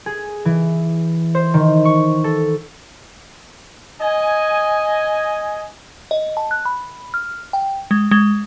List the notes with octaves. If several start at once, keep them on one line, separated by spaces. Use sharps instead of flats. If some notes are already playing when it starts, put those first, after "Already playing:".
G#4
E3
C5
D#3
C#6
A4
D#5 G#5
D#5
A5
F#6
B5
F6
G5
G#3
G#3